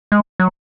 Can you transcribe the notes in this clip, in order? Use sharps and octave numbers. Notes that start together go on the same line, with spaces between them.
G#3
F#3